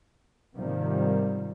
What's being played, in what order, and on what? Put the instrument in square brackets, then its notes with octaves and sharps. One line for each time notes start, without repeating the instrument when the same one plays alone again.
[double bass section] G#2 C3 D#3 F3 G3 A#3